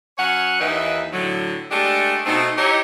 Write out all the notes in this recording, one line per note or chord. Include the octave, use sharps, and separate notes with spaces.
F#3 C#4 C#5 F#5
D#2 E3 D#4 B4 E5
A2 D3 F#3
G#3 A3 D4 G4 D5
B2 A3 C4 D#4
D#4 E4 G4 C#5 D#5